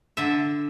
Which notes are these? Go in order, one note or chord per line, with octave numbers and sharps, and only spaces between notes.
D3 E5